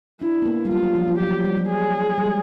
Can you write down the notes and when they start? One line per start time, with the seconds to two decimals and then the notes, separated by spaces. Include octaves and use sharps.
0.21 D4 E4
0.42 B3
0.46 A#3
0.65 G3
0.70 F#3 F4
0.82 F#3
0.95 F3
1.08 F3
1.19 F#3 G4
1.27 F3
1.31 F#3
1.45 G3
1.57 F#3
1.69 G#4
2.18 G3
2.26 G#3